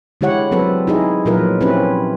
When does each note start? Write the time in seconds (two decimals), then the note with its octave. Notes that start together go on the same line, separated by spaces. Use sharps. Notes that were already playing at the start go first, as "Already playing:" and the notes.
0.21 D3 G#3 E4 G4 C#5 F#5
0.51 F#3 C4 A4 B4
0.87 D#4 E4 G#4 D#5
1.25 A#2 F3 F#3 F4 A#4 B4
1.61 C4 C#4 E4 G4 B4